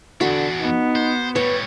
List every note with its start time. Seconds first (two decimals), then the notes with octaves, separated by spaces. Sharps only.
0.21 E2 D3 D4 F#4 B5
0.60 B3 D#4
0.96 C5
1.36 A2 G3 B4 C#5